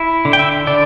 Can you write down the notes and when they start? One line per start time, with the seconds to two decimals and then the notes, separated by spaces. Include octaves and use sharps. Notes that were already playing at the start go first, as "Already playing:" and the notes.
Already playing: E4
0.25 D3
0.33 G5
0.39 E5
0.67 D3 D5